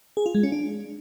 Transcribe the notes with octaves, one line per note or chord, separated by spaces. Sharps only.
G#4
F4
G#3
C#4
D4